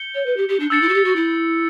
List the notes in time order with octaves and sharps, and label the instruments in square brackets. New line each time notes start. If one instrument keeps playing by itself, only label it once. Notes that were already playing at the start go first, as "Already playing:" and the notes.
Already playing: [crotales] G6 C#7 G7
[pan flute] C#5
B4
G4
G4
D4
[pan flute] D4 [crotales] E6 A6 C#7
[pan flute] E4
F#4
G4
F#4
E4